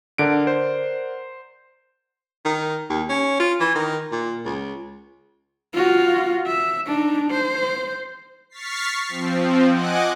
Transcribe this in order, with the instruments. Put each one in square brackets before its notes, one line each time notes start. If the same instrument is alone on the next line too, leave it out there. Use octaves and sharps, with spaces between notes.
[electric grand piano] D3 D7 [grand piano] A#4 D5 F#5
[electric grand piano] C5
[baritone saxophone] D#3
D#2
C#4
F4
E3
D#3
A#2
C#2
[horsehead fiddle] F4 F#4
E5
D4 D#4
C5
[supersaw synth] C#6 F6 A6 B6 C7
F3 C4
D#5 F#5 G#5 D6 F#6